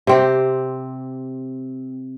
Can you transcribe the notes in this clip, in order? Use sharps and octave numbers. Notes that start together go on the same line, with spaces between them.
C3 C4 G4